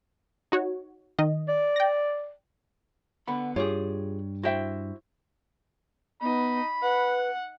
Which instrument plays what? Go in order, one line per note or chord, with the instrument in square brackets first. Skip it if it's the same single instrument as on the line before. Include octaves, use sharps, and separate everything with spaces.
[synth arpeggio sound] D#4 F#4 C#5
D#3 D#5
[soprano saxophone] D5
[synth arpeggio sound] G5 A#6
[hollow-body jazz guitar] D3 B3 B5 [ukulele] F#5
[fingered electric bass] G2 [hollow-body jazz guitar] F4 G4 G#4 [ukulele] C#5
[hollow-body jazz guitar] E4 G5 [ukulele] F#4 C5 E5
[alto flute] B3 [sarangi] D#4 [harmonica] B5
[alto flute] B4 [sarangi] F#5